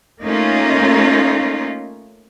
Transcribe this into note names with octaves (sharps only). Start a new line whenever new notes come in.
A3 A#3 C#4 D#4 F4